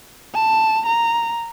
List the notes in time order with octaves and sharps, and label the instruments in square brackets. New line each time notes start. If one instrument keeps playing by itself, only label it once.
[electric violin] A5
A#5